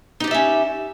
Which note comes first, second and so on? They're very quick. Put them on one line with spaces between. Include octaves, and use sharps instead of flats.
D#4 G4 D5 E5 C#4